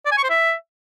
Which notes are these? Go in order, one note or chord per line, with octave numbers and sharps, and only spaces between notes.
D5
G#5
C#6
C5
E5